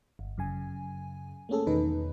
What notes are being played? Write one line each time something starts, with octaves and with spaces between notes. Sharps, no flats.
G1
F#2 C#3 G#5
A3 A#3 C#4 G#4 A4
E2 B2 D#3 D#4 B4